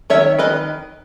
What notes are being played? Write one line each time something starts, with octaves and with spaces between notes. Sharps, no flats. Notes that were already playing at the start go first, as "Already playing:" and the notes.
D#3 C#5 E5
D#3 B4 D#5